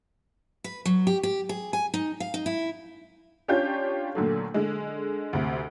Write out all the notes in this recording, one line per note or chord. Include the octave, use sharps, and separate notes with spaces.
B4
F#3
G4
G4
G#4
G#5
D#4
F5
D#4
E4
C#4 D4 F4 G4 C#5 G6
A#2 D3 F#3 A3
D3 G#3
D2 C3